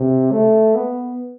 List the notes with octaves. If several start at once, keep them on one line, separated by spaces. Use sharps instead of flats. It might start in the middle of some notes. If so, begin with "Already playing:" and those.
Already playing: C3
A3
B3